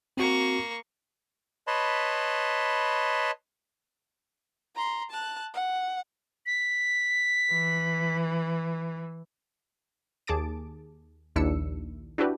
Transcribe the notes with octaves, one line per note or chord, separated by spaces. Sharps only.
A#3 C4 F#4 C#6
B4 C#5 D#5 A5 B5 C6
A#5 C6
A5 F#6
F#5
B6
E3
D#2 G#4 A5 D6 A6 D7
A#1 D#2 D4 E4 E6 C#7
D4 E4 F#4 G4 B4